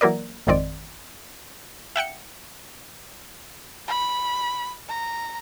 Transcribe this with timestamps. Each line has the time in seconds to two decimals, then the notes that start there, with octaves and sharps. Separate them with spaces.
0.01 E3 F#3 A#3 A#4 D5
0.47 G#1 F2 D#3 C4 D5
1.96 E5 F#5 G5 C#7
3.88 B5
4.88 A#5